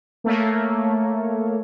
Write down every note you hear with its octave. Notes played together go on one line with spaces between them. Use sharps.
A3 A#3 C#5